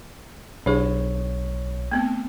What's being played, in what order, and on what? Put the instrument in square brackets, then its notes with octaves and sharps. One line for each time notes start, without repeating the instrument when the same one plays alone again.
[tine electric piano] B1 C#5 [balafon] D4 G#4
[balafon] A3 B3 C4